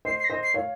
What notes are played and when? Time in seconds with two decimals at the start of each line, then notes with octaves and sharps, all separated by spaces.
0.05 C5 D#5 C7
0.20 C7
0.25 A#6
0.30 C5 D#5
0.43 C7
0.54 C#5 F5